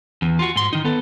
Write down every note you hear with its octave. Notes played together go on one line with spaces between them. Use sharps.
E2
F4 F#4
G#2 C6
D#3 D#4
B3 A4